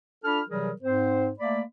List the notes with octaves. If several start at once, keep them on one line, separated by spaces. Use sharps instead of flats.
D4 F4 A4 B5 F6
C3 E3 F#3 G3 G#4 A#4
G#2 C4 C5
A3 A#3 D5 B5